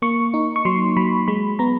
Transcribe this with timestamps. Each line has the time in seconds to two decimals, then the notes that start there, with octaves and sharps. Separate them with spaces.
0.02 A#3 C#6
0.34 D#4
0.56 C#6
0.65 F#3 C6
0.96 F#3 B5
1.28 G#3 B5
1.59 B3 A#5